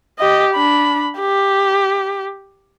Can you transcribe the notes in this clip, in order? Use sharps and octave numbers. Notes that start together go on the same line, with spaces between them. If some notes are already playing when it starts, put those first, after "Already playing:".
G4 D#5
D4 B5
G4